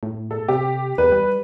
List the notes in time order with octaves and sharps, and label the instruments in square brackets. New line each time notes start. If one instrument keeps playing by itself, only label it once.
[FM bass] A2
[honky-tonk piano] A4
[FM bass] C3 [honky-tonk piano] G4
[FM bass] E2 [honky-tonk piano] B4
[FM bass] G3